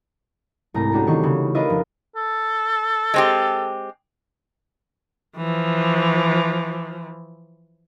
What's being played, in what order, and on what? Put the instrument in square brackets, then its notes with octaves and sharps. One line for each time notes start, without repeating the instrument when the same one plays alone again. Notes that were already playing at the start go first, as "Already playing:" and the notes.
[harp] C2 G#2 A3 A#5
C#4 D4 F#4 G4 A4
C3 D#3 E3 C6 C#6
C#3
D4 F4 A#4 B4 D#5 E5
F1
[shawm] A4
[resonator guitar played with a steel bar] G#3 C4 G4
[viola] E3 F3